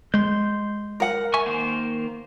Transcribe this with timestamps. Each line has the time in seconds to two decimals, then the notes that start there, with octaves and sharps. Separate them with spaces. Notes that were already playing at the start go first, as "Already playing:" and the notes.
0.14 G#3 C6 G6
1.00 A#4 F#5
1.34 E5 G#5 C#6
1.46 D#3 A#3 C5